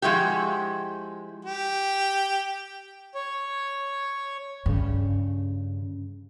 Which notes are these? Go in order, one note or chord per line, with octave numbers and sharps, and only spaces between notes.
F3 G#3 E4 F#4 G4
G4
C#5
G2 C#3